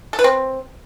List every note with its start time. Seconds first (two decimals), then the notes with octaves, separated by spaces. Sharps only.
0.13 A4
0.19 B4
0.24 C4